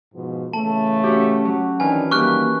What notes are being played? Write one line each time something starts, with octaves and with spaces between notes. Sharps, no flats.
G#2 B2 F3
C#3 E3 A3 A5
C#4 F#4 G4
F#3
D#3 E3 C4 D4 G#5 F6
D#3 G3 A#3 G4 C#6 F6 F#6